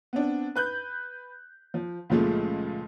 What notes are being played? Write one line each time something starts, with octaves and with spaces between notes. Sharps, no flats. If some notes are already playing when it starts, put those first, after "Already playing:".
B3 C4 D4
B4 F#6 G6
F3
C#2 A#2 F3 G#3 A3